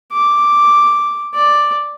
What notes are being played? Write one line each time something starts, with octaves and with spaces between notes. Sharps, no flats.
D6
D5